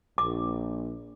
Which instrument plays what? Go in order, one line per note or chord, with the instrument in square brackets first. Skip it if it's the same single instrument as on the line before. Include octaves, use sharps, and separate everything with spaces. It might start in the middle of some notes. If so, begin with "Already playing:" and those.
[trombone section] A#1 [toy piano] D6